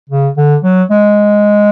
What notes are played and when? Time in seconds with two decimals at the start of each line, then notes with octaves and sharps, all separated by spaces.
0.09 C#3
0.37 D3
0.64 F#3
0.91 G#3